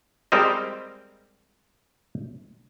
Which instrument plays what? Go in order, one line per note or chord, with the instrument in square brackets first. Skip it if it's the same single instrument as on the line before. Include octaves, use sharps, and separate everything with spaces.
[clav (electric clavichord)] G3 G#3 C4 A#4 C5 D#5